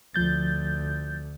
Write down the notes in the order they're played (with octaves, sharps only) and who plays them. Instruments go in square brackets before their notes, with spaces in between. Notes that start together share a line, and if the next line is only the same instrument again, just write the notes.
[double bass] D2 [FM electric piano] F3 G6 A6